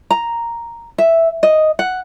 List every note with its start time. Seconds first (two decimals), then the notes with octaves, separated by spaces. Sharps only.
0.11 A#5
0.98 E5
1.43 D#5
1.79 F#5